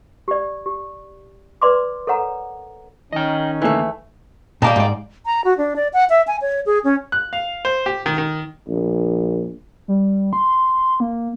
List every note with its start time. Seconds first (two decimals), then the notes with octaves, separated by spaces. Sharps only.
0.28 G4 D5
0.66 G4
1.62 B4 D5 C6 D6
2.07 A4 A#4 C#5 F#5 A#5
3.13 D#3 C#4 D#4 D#5 G5
3.62 D3 E3 A3 A#3
4.62 A#2 G3 A#3 D#4 A5
4.76 G#2 D5
5.26 A#5
5.44 F#4
5.57 D4
5.76 D5
5.93 F#5
6.10 E5
6.27 G#5
6.41 C#5
6.66 G#4
6.84 C#4
7.12 F#6
7.33 F5
7.65 C5
7.86 G4
8.06 D#3
8.18 D#3
8.68 A#1
9.88 G3
10.33 C6
11.00 A#3